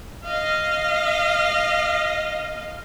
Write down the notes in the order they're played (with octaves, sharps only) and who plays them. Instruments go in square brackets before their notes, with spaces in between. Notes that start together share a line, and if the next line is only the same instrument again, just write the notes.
[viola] D#5 F5